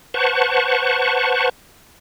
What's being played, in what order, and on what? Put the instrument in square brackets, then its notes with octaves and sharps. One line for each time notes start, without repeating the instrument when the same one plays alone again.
[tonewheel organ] B4 C5 F#5 A5 C#6